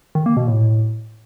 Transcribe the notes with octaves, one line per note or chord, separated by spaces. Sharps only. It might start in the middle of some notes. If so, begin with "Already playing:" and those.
D#3
A#3
B2
A2